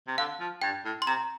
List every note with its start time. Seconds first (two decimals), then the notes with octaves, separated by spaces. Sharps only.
0.07 C3
0.18 D3 F5
0.40 F3
0.62 G2 G5
0.85 A2
1.02 C6
1.07 C3 A#5